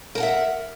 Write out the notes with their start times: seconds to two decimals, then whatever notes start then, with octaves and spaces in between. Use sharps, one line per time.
0.15 A#4
0.18 A5
0.20 F#5
0.23 E5